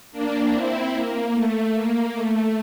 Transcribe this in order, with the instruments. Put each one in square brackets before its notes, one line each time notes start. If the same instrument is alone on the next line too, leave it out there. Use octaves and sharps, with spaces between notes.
[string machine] A#3 D4
C4 E4
A#3
A3
A#3
A3